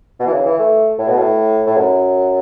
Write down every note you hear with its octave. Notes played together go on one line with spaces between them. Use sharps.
B2
E3
C#3
E3
A3
A2
B2
A2
A2
F#2